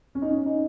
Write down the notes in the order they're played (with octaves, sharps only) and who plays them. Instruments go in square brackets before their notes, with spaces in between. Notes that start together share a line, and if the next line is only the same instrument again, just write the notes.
[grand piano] C#4
D#4
C#4
D#4